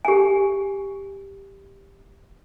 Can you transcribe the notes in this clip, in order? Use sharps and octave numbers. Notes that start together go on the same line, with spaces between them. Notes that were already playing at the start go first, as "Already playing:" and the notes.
G4 G#5